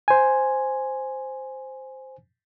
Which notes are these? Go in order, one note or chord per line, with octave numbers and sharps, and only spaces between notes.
C5 G#5